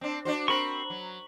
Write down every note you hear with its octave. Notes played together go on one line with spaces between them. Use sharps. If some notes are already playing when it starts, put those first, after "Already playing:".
C4 D4
D4 F#4 C5
C4 F#4 A#4 B5 C#6
F#3